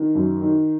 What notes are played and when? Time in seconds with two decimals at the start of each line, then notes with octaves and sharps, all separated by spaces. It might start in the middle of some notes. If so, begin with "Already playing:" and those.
Already playing: D#3
0.15 F#2
0.42 D#3